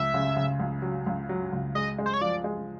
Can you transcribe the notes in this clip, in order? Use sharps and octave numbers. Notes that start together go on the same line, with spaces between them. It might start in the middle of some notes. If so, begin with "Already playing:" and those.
Already playing: C#2 E5
C#3
C#3
C#2
F#3
C#2
F#3
C#2
G#3 D#5
G#3
C5
C#5
F3 D5
G#3